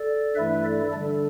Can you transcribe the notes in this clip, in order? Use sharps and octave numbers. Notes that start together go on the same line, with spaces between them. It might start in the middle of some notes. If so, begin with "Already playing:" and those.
Already playing: A4 D5
G2 E3 A3 E4 B4 E5
A4 D5
D3 G3 D4 A4